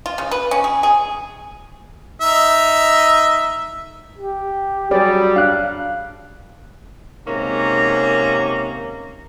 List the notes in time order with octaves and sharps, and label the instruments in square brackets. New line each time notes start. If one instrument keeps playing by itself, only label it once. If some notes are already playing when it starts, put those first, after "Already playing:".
[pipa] F4
C#3
B4
C#4
G#4
G#4
[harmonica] D#4 E5
[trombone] G4
[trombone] F#3 [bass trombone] G3 [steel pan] G#4 C#5 D5
[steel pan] D4 [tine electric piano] F5 F#6
[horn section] G#2 C3 A#3 C#4 A#5